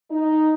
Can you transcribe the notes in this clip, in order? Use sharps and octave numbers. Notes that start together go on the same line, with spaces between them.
D#4